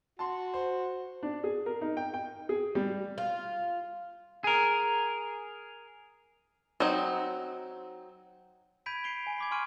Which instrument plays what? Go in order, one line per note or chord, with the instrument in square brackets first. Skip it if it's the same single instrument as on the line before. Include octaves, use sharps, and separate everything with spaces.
[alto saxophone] F#4 [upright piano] A5 C6
[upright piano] C5
[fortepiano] D4
G#4
A#4
D#4
G5
G5
G#4
G3
[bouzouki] F4
[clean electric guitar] G#4 A#4
[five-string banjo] F#3 C4 D#4
[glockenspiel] B5 G6 G#6 B6 D7 D#7
C7 D7 F7 G7
G#5
B5 D6 G#6
G#5 C6 C#6 F6 D7 D#7